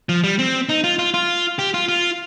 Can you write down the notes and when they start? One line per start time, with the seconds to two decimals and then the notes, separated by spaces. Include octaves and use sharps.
0.09 F3
0.24 G3
0.39 C4
0.69 D#4
0.84 F4
0.99 F4
1.14 F4
1.59 G4
1.74 F4
1.89 F4